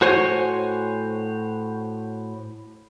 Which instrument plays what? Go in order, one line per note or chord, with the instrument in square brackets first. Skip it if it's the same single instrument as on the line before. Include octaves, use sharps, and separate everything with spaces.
[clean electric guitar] A2 F#4 C5 C#5 G5 G#5